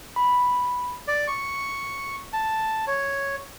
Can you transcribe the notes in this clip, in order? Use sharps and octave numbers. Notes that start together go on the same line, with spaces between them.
B5
D5
C#6
A5
C#5